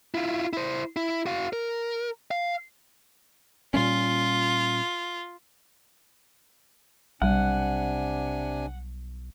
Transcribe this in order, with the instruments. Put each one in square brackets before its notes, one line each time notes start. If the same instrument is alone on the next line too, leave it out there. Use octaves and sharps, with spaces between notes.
[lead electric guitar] E4 F4
E4 C5
E4
F#4 F5
A#4
F5
[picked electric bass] A#2 G3 C#4 [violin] F4
[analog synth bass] B1 [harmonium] C3 D4 G#5 [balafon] G3 [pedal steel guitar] F#5